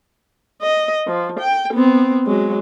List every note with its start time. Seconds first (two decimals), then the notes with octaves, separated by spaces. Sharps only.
0.62 D#5
1.07 F3
1.40 G5
1.74 B3 C4
2.26 F#3 G#3